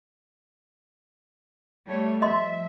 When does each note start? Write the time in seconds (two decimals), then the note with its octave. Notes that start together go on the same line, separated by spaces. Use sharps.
1.86 G3 A3 C#5
2.22 F3 D#5 E5 C6